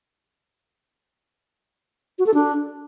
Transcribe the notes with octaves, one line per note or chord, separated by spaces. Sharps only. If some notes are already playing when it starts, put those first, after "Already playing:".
F#4
A4
D4